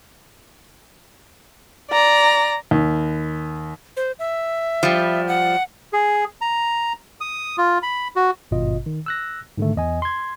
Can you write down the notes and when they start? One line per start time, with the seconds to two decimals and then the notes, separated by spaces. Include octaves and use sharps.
1.91 D5 A#5
2.71 D#2
3.97 C5
4.19 E5
4.83 F3 G3
5.28 F#5
5.93 G#4
6.41 A#5
7.21 D#6
7.58 F4
7.83 B5
8.16 F#4
8.51 G#1 G2 B2 F4 D#5
8.86 D#3
9.06 E6 F#6 A#6
9.58 G#2 D3 D#3 A3
9.76 E2 D#5 G#5
10.02 C6 G#6